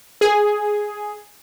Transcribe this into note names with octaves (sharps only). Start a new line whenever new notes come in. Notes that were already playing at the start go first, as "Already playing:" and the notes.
G#4